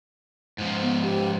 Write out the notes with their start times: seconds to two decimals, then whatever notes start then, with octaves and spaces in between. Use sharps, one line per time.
0.58 G#2 F3
0.82 B3
1.03 G4